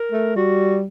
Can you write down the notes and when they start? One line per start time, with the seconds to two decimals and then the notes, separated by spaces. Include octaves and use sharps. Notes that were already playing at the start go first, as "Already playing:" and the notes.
Already playing: A#4
0.12 A3
0.36 G3 F#4